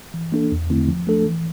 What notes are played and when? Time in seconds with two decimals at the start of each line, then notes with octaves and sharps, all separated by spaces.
0.14 E3
0.32 A#3 D4 A4
0.52 E2
0.70 D3 A3 C4 E4
0.88 F3
1.07 A3 D4 A4
1.26 E3